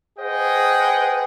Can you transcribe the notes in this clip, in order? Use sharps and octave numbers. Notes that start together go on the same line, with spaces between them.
G#4 B4 C5 D#5 F#5 G5